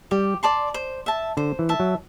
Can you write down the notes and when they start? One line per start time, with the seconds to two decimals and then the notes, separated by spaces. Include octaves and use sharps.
0.11 G3 G4
0.43 D5 A5 C6
0.74 C5
1.06 E5 A5
1.37 D3 C5
1.59 E3
1.69 E5 A5
1.80 F#3